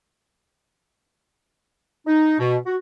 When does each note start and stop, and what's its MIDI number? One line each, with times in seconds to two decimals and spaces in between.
2.07 2.39 63
2.39 2.56 47
2.66 2.75 66